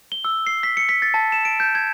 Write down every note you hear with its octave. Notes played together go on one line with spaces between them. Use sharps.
G7
E6
C7
B6
C#7
B6
A6
A5
E7
D7
G6
G#6